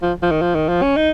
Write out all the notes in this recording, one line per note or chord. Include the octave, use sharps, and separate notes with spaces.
F3
F3
D#3
F3
D#3
F3
C#4
D#4